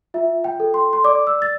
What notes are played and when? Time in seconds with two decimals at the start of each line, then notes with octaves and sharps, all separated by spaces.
0.14 F4 E5
0.44 G5
0.60 A4
0.74 C6
0.93 C6
1.04 D5 D6
1.27 E6
1.42 A6